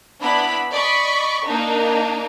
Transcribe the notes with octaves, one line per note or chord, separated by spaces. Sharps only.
B3 D4 E4 B5
D5 D#5 B5 C#6
A#3 D4 D#4